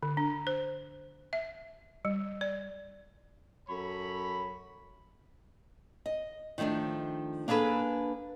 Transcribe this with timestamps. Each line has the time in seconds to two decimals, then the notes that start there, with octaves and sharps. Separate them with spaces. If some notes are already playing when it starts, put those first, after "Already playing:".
0.03 D3
0.17 D4
0.47 C5
1.33 E5
2.05 G3
2.41 D5
3.69 F#2 A4 C#5 B5
6.06 D#5
6.58 D#3 F3 A3 C#4 D4
7.48 A#3 D4 G#4 A4 B4